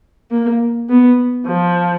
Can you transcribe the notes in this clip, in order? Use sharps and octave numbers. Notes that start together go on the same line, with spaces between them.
A#3
B3
F3